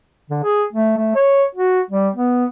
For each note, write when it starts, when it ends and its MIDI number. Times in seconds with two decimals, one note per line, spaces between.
0.30 0.41 50
0.43 0.65 68
0.73 0.94 57
0.97 1.14 57
1.15 1.43 73
1.55 1.80 66
1.90 2.08 55
2.15 2.45 59